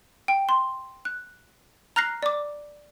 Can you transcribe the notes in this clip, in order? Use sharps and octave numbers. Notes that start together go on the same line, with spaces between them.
G5
C6
F#6
A#5 F6 F#6 A#6 C7
D5 D6